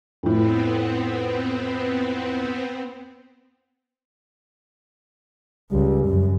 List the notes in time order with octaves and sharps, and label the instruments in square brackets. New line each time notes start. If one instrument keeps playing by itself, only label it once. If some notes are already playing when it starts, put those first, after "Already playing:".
[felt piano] F2 A2 [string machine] B3 C4
[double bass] C#2 [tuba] G3
[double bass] F#2